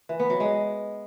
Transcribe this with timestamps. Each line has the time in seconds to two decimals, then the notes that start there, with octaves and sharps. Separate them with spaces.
0.09 E3
0.20 B3
0.30 F#3
0.40 G#3